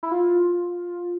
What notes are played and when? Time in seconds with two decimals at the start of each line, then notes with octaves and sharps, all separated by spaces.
0.03 E4
0.11 F4